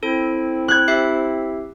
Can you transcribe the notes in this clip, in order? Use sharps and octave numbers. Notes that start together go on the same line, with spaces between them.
C4 E4 A4 D7
F#6 G#6
G4 E5 C7